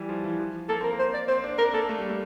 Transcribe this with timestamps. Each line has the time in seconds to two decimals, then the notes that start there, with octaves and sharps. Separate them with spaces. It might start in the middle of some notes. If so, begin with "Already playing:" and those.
Already playing: E3 G3
0.09 F3
0.24 E3
0.39 F3
0.69 A#3 A4
0.81 C4 A#4
0.92 A#3
0.99 C5
1.14 D5
1.28 C4 C5
1.44 D4
1.59 D4 A#4
1.74 A#3 A4
1.89 A3
1.99 G3
2.10 A3